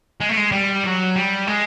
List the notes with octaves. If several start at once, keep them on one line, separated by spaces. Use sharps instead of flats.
G#3
A3
G#3
G3
F#3
G3
G#3